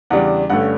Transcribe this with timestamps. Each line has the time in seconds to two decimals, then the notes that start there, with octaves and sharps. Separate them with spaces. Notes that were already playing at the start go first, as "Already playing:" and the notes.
0.10 E2 C#3 G3 D4 F#5
0.50 G2 D3 A3 C#4 F#5